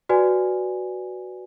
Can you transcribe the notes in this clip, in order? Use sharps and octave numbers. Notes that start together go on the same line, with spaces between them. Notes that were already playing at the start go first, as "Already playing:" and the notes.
F#4 B4 D5 G#5